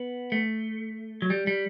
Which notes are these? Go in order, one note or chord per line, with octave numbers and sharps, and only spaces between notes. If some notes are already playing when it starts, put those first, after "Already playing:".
Already playing: B3
A3
F#3
G3
G3